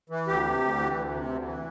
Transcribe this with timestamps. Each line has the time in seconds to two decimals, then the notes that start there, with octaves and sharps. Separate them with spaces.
0.10 E3
0.27 D2 G4
0.43 C3
0.61 D2
0.77 E3
0.94 D2
1.11 C3
1.29 D2
1.45 E3